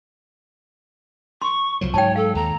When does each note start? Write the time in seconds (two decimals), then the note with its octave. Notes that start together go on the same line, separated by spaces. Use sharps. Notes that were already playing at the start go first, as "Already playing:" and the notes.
1.42 C6 C#6
1.81 C2 F3 F#3
1.94 G#2 F#3 C#5 G5 A5
2.16 A4 F5
2.35 D#2 A#5